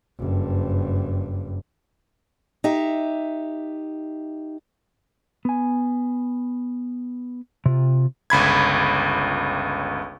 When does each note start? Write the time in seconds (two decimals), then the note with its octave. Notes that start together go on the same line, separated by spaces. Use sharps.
0.19 F#1 G2
2.64 D#4 G4 E5
5.45 B3 G#5
7.66 C3 F4
8.30 G1 C#2 B5 G#6